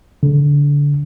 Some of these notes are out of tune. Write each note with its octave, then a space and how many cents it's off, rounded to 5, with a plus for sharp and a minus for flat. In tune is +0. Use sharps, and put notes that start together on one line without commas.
D3 -25